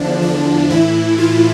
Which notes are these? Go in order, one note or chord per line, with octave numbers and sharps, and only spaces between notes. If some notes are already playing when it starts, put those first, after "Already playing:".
Already playing: E2 D3 F3 D4
D4
A2 E3 E4
F4